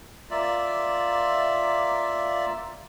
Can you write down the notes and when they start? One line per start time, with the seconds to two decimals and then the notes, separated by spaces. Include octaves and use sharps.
0.31 A#3 F4 D5 E5